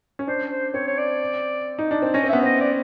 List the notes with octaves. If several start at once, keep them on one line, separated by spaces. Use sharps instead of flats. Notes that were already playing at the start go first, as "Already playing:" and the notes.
C#4
D4 C5
C5
C4 C#5
C#5
D5
D#4
D4
C4
C#4 D#5
C4
B3 E5
C4 D#5
D5